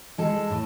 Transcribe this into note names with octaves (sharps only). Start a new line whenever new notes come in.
G#3 A4
A2